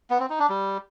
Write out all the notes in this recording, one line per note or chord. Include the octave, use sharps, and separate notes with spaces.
B3
C4
D#4
D4
G3